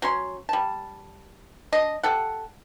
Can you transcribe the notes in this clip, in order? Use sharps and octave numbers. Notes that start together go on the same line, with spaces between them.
F#3 C#4 C6
G3 A5
D4 D#5
G4 A4 F#5